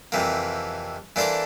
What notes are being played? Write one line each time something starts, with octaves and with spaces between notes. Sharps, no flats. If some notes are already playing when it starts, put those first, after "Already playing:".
F2 C3 E3 A#3
E3 A#3 D4 A4 C5